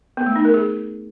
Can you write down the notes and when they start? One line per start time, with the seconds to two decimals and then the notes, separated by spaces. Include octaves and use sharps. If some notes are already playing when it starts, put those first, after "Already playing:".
0.17 B3
0.26 A3
0.36 D#4
0.45 A#4
0.54 G#4